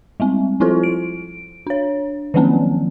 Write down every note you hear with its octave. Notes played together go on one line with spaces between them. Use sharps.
G3 G#3 C4
F3 C4 E4 F4 A4 C5
D7
D4 C#5
D#3 F3 F#3 A#3 C4 C#4